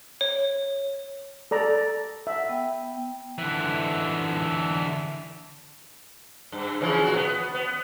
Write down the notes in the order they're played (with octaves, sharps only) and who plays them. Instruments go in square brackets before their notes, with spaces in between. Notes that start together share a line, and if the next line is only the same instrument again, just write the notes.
[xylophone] C#5
[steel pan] A4 D5 A#5
[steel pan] E5 [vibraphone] F#5
[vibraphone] B3 G5
[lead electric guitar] D3 E3
[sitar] G2
C#3 E3 F3
A#2 F#4
B3
B3